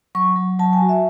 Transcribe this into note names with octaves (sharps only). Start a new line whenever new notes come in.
F#3 C#6
F#3
F#3 A5
G#5
F#4
E5